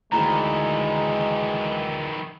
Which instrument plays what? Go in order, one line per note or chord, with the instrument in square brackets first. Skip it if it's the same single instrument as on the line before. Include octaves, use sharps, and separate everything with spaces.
[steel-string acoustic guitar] D2 E4 F5 [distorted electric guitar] D#3 E3 [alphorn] G#3 [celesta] A#5